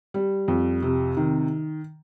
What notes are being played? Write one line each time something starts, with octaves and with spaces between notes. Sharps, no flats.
G3
F2
C3
D#3